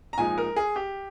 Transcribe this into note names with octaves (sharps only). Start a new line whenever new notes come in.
A#5
A#2 F3 G#3 D#4 G#5
A#4
G#4
G4